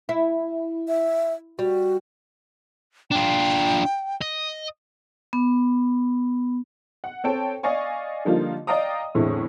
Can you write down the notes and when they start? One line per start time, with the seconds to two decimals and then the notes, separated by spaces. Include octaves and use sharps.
0.09 E4
0.88 E5
1.59 G3 F#4
3.12 D4 F4 G5
4.21 D#5
5.33 B3
7.04 F#5
7.24 C4 A4 C#5 G5 A5
7.63 D5 D#5 F5 G#5 C#6
8.25 D3 F3 G3 A#3 D#4 F4
8.67 D5 D#5 F5 G5 A#5 D#6
9.15 E2 A2 D3 G#3 C4 E4